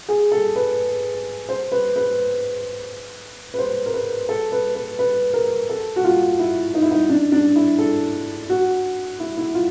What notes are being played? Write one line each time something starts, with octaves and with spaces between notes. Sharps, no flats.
G#4
A4
B4
C5
B4
B4
B4
C5
A#4
B4
A4
B4
B4
B4
A#4
A4
F#4
F4
E4
D#4
E4
D#4
D4
D4
E4
A4
F#4
E4
E4
F4